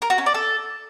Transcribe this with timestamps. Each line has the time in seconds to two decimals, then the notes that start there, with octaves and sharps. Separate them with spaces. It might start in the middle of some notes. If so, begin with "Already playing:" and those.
0.02 A#4
0.10 F#4
0.18 C#4
0.26 D5
0.34 A4